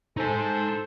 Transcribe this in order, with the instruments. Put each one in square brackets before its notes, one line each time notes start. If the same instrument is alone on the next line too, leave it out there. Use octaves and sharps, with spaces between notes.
[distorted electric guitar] D#4 G#5 [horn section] A4 C5